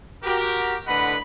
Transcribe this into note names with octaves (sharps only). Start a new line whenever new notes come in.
F#4 G4 A#4
A2 D3 B4 D#5 F#5 B5